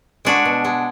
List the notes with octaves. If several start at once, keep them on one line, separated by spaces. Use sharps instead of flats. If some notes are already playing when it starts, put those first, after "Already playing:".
G#3 D4 F#4
B2
G#3